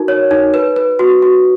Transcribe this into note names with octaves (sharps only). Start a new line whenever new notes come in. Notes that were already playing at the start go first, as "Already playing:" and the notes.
Already playing: D#4 F#4 A#4
C#5
D#4
B4
B4
F#4
F#4